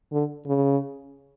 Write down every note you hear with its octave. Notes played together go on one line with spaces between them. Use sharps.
D3
C#3